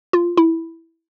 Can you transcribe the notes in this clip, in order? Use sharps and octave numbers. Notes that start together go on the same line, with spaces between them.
F4
E4